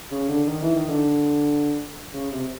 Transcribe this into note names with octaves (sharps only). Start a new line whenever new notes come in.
C#3
D3
D#3
E3
D#3
D3
C#3
C3